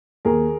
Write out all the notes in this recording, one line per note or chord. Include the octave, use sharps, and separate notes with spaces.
D#2 G#4 A#4